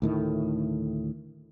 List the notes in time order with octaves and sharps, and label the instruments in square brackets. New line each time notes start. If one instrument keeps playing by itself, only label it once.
[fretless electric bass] D2 A2 D#3 A3